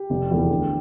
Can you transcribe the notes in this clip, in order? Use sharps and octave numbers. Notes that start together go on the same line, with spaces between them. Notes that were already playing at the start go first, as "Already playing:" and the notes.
Already playing: G4
F1
E2 E3 A3
D2